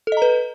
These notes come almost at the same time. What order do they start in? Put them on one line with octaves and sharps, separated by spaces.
A4 D#5 A#5 B4